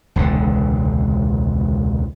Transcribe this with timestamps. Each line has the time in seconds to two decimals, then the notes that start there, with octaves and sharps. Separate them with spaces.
0.16 E1 C#2 D3